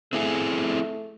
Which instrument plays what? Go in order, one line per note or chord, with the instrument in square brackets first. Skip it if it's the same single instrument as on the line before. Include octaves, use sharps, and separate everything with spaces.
[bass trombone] A3 [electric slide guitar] C4 E4 G#4